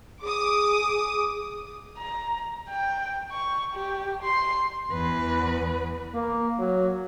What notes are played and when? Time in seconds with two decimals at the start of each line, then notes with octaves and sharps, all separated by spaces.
0.22 G#4 D6 D#6
1.98 A#5
2.69 G5
3.32 C#6
3.74 G4
4.23 C6
4.92 E2 B4
6.14 A#3
6.59 F#3